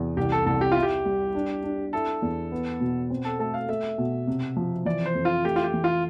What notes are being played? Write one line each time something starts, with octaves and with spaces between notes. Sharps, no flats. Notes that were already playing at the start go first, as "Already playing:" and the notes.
Already playing: E2 C3
C2 G4
A4
C2 A4
G4
E4 F4
G4
G3
D4
D4
E4 A4
E2
B3
B2
C4
A4
A3 A4
F5
A3 E5
B2
C3
F3
E3 D5
C5
F2
F4
A3 G4
F4
G4
E3
F4